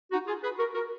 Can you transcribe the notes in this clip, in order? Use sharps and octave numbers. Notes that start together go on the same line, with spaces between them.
D#4 F#4
F4 G#4
G#4 B4
F#4 A#4
F#4 A#4